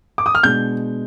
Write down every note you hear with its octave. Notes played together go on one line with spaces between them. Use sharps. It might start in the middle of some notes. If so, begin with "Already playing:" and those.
D6
D#6
F6
B2 G#3 D4 G6